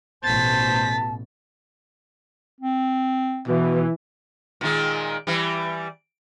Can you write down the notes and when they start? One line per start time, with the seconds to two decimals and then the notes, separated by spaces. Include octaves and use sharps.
0.23 A1 B2 C5 A5 A6 B6
2.60 C4
3.48 B2 E3
4.61 A#2 D#3 G#3
5.27 E3 G3